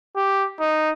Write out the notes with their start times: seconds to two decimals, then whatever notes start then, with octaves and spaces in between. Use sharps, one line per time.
0.17 G4
0.60 D#4